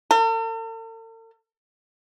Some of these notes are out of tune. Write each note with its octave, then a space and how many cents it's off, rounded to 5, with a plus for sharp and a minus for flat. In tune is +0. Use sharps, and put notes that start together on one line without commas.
A4 +45